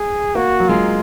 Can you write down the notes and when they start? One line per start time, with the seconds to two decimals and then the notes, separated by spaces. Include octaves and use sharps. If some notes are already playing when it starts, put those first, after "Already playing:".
Already playing: G#4
0.35 A#3 F#4
0.60 F#3
0.69 G#3 F4